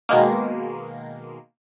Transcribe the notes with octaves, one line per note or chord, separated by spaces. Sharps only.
B2 D#3 G#3 A#3